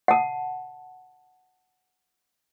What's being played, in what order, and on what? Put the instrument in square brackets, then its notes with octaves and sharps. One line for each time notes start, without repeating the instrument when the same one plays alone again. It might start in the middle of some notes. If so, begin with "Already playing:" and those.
[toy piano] F#5 A5